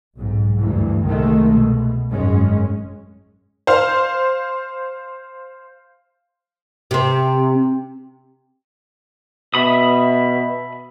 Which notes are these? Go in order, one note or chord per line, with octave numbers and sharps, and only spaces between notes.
B1 G#2
D2 G2 E3
C2 D#3 G#3 A3
B2
G#1 F#2 G#3 C#4
C5 F5
C3 C4
B2 E5 B5 D#6